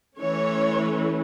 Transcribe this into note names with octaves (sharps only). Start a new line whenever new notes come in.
E3 A3 C#4 C#5